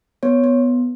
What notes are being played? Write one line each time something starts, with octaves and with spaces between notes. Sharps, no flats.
B3 C#5
B3